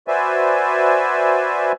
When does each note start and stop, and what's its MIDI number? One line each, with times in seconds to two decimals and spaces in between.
0.08 1.72 66
0.08 1.72 71
0.08 1.72 72
0.08 1.72 74
0.08 1.72 76
0.08 1.72 80